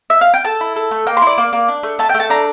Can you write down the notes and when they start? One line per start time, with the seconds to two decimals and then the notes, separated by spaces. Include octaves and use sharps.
0.10 E5
0.21 F5
0.34 G5
0.45 A4 A5
0.60 E4
0.76 A4
0.91 A3
1.07 A#3 G5
1.17 C6
1.22 E4 D5
1.38 A#3
1.53 A#3
1.68 D4
1.83 A3
1.99 A3 A5
2.09 G5
2.14 A3
2.20 A5
2.30 D4 A#5